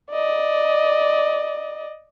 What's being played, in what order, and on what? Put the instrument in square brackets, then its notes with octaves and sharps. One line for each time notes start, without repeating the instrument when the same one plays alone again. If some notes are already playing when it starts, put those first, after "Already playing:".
[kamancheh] D5 D#5